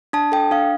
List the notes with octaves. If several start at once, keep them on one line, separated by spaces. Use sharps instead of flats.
D4 A5
A4 G5
D4 F5